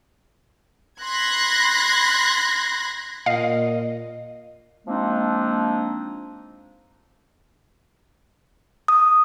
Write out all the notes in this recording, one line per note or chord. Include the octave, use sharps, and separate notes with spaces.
B5 C6 F#6 G#6 A#6
A#2 D#5 F5
F3 G#3 A#3 C4 D4 D#4
D#6